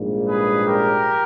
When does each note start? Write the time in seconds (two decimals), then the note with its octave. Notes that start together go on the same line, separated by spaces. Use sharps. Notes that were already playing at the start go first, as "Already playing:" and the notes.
Already playing: A#1 G#2 G3 A#3
0.27 G#4 B4
0.65 G4 A#4